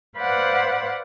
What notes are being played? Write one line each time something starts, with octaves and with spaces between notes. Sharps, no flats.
B4 C5 D5 F5 F#5 B5